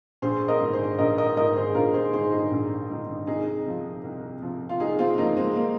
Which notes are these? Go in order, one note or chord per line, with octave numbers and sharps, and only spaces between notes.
A#1 G#4 C5
A#4 D#5
G#2 D#3
G#4 C5
A#1 A#4 D#5
A#4 D#5
G#2 D#3 A#4 D#5
G#4 C5
A#1 F4 A#4
G#4 C5
G#2 D#3 G#4 C5
D#4 G#4
A#1
G#2 D#3
C2 D#4 G#4
C3 F3
C2
C3 F3
F4
C2 D#4 G#4
C4 F4
C3 F3 A#3 D#4
G#3 C4
A#3